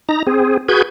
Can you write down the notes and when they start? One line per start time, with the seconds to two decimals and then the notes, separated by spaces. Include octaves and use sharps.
0.09 D#4 A#5
0.27 C4 G#4
0.69 F#4 G#4 B4 G6 G#6